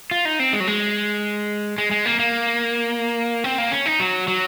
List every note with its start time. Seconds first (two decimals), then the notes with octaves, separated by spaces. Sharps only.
0.11 F4
0.25 D#4
0.40 C4
0.53 G#3
0.60 F#3
0.67 G#3
1.78 G#3
1.91 G#3
2.06 A#3
2.19 A#3
3.44 C4
3.58 A#3
3.72 C#4
3.86 D#4
4.00 F#3
4.28 F#3